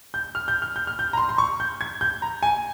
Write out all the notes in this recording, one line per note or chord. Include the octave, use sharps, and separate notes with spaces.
G6
F6
G6
F6
G6
F6
G6
A#5
C6
C6
C#6
G6
G#6
G6
A#5
G#5